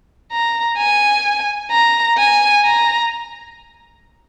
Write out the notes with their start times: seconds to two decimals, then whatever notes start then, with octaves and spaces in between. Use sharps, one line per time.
0.32 A#5
0.78 G#5
1.71 A#5
2.18 G#5
2.65 A#5